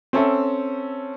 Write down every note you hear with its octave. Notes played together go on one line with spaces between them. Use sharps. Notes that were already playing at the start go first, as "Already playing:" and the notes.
C4 C#4 A4 E5